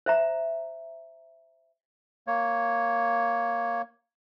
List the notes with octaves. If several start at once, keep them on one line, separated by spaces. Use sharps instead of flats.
C5 E5 A#5
A#3 C#5